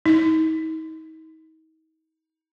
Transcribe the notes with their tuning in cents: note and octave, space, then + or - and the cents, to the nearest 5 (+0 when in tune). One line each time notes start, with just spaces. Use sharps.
D#4 +40